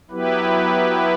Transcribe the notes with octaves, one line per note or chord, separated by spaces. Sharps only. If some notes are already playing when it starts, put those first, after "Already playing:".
F#3 B3 E4 G4 B4